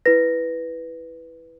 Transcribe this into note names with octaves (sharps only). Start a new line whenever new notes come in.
E4 B4 A#6